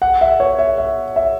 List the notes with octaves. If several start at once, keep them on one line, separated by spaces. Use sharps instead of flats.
F#5
E5
C#5
E5
E5
E5